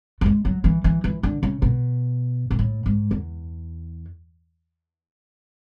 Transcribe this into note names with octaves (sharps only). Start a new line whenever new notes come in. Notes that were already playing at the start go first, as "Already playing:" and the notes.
A3
G#3
F#3
E3
E3
E3
D3
C#3
B2
G#2
A2
G#2
E2